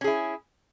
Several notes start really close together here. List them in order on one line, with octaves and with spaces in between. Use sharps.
C#4 G#4 E4